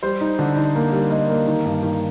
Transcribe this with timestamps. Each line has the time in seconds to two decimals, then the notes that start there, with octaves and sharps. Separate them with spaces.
0.03 G3 C5
0.21 D#4
0.39 D3
0.57 D#4
0.75 A#3
0.92 G3
1.10 A#3 D#5
1.29 A#3
1.47 D#3
1.65 G2
1.83 D#3